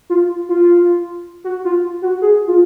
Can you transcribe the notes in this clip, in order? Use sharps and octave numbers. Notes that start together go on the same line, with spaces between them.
F4
F4
F#4
F4
F#4
G#4
F4